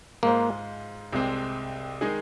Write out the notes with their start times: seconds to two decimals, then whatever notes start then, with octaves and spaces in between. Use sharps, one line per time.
0.23 G#2 G#3 A#3 F4 C5
1.12 C2 C3 G#3 C4
2.01 D#3 G#3 D#4 G#4